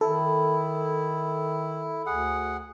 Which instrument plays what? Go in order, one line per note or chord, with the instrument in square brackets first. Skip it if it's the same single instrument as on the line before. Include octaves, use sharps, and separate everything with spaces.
[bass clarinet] D#3 [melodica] E4 [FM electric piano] A4
[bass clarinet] D2 [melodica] G#4 F#5